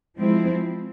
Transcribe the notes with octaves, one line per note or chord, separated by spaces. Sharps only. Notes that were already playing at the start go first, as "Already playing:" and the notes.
F3 G#3 C4 E4